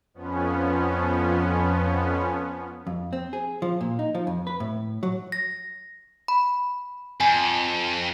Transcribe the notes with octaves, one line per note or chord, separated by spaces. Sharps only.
F2 F3 B3 C#4
F2
C4
G#4
F3
A#2
D#4
F3
F2
B4
A2
F#3
A#6
B5
F2 G#5